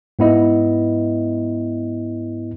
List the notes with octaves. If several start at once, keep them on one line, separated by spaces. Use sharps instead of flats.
G#2 B3 E4 D#5